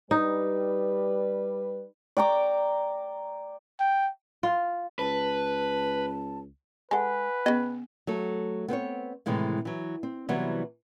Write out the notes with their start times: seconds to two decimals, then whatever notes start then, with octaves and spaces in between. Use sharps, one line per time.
0.11 G3 D#4 B4
2.17 D5 G5 A#5 D6
3.80 G5
4.43 F4
4.99 C#2 B4 A5
6.91 G#3 A4 B4 F#5 G#5
7.46 C#3 B3 D#5
8.07 F#3 A3 A4
8.68 B3 C4 B4 C#5
9.26 A2 C3 D#3 E3 G#3 A3
9.65 E3 F#3
10.03 C4
10.29 C3 E3 F#3 G3 B3